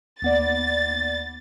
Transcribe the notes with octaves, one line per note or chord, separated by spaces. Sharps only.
D#2 B3 D5 A6